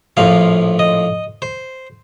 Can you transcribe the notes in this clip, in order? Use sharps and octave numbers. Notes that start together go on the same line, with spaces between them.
A#1 A2 F3 F5
D#5
C5